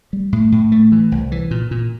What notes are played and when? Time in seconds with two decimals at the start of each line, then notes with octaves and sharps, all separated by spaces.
0.13 G3
0.33 A2
0.52 A2
0.72 A3
0.92 E3
1.12 C2
1.32 E3
1.51 A#2
1.71 A#2